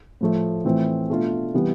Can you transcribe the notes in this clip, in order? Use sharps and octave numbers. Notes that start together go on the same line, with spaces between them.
A2 F3 A3
A2 E3 A3 C4 F4
B2 A3 D4 F4
C3 E3 G3 B3